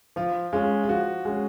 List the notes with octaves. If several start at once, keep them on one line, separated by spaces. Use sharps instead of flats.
F3 F4
G#3 C#4 F4
F4
F3 F#4
G#3 C#4